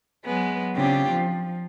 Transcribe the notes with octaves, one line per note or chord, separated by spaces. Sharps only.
F#3 G#3 B3
C#3 C4 D4 F4 G4
F3